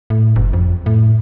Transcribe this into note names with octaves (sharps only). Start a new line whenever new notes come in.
A2
F#1
F2
A2